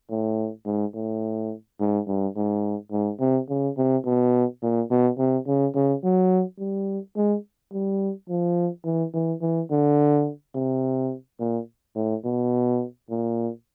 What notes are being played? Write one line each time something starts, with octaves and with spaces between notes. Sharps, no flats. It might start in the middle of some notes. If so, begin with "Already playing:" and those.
A2
G#2
A2
G#2
G2
G#2
G#2
C3
C#3
C3
B2
A#2
B2
C3
C#3
C#3
F#3
G3
G#3
G3
F3
E3
E3
E3
D3
C3
A#2
A2
B2
A#2